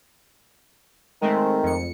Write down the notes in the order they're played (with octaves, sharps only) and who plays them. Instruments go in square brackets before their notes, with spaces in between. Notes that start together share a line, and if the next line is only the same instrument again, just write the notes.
[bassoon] D#3 [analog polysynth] G#3 A3 C4
[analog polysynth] F2 C#7